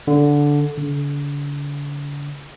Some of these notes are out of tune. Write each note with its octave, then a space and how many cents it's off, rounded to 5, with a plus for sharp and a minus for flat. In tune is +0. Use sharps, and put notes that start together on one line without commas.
D3 -10
D3 -40